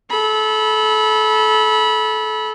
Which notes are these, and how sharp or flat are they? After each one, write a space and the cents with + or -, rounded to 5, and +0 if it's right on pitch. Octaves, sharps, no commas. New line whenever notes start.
A4 -25 B5 -20